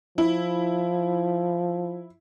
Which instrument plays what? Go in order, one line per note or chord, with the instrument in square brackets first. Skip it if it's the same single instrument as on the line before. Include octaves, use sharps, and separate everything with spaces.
[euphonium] F3 [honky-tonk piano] E4